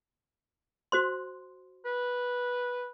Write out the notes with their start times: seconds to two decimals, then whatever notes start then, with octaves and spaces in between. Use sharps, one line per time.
0.92 F#4 C5 C6
1.86 B4